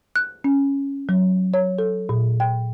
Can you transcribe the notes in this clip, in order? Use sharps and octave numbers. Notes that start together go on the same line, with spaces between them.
F#6
C#4
F#3
C#5
A4
A#2
G5